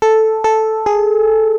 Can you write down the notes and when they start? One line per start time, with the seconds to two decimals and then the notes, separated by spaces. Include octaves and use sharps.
0.02 A4
0.44 A4
0.86 G#4